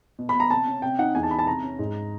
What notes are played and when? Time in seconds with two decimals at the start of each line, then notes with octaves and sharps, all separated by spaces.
0.19 B2
0.29 B5
0.35 B2
0.40 A#5
0.50 C3 A5
0.67 C#4
0.82 C3 G5
0.99 D#4 F#5
1.15 E2 G#5
1.23 A5
1.31 C#4 B5
1.39 A5
1.47 C3 A#5
1.63 C#4
1.79 G#2